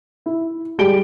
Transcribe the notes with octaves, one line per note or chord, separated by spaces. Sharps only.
E4
G3 G#3 G4 D7 G7